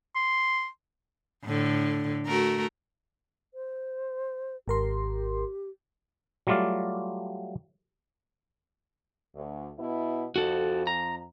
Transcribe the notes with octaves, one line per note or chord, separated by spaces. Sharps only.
C6
A2 D3
A3 F#4 A#4
C5
G#1 G4 A#4 C6
F#3 G3 A3 F4 D5 F5
D2
B2 B3 E4
F2 F#4 A4
A#5